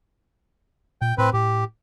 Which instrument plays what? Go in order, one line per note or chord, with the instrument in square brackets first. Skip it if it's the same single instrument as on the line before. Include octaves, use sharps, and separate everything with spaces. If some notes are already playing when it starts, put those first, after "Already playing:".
[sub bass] A#2 [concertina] G5
[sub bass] A2 [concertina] C4 B4
[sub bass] A2 [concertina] G4